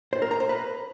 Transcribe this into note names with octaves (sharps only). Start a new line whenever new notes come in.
C5
A#4
A#5
C5
B4